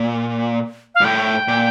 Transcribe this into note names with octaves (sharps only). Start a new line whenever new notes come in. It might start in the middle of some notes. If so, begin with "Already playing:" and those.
Already playing: A#2
F5
G2
A2 G5
A#2